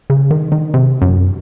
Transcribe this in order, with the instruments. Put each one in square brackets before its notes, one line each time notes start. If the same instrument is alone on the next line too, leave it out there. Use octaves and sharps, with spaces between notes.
[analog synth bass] C#3
D#3
D#3
C3
F#2